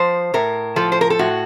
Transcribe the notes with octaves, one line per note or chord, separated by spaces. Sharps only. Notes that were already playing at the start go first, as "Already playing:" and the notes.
Already playing: F3 C5
A2 A#4
F3 A4
C5
A#4
A4
A2 F#4